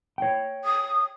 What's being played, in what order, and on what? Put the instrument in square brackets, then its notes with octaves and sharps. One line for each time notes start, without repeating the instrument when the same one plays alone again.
[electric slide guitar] C#5 G5
[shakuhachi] D#6